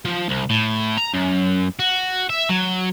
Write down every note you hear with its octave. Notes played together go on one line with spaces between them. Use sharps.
F3
C2
A2
A#5
F#2
F#4
E5
F#3